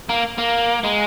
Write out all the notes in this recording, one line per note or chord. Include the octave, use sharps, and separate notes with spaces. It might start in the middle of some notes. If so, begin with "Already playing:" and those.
A#3
A#3
G#3